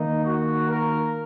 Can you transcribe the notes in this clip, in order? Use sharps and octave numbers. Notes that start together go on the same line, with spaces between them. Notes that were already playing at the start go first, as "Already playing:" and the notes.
Already playing: D#3 A#3 D#4
F#4
A#4